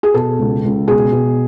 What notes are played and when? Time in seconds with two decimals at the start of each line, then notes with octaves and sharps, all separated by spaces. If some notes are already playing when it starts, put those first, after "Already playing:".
0.03 G#4
0.14 B2 A4
0.39 C#2
0.64 C#2
0.88 B2 G#4
1.12 B2